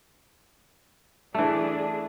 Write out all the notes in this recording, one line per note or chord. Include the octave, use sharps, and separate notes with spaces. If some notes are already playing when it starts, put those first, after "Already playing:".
E3 A3 D4 G#4